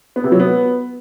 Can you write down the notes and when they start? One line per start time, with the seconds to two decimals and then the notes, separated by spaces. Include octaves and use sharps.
0.16 B3
0.24 C3
0.32 F#3
0.40 B3